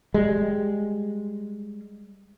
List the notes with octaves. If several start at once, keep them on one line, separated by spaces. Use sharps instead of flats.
G3 G#3